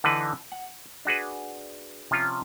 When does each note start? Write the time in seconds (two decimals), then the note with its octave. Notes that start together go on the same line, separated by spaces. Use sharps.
0.04 D3 E3 D4 D#4 B4
0.52 F#5
1.05 D4 F#4 G#4 B4
2.11 C3 F3 C#4 F4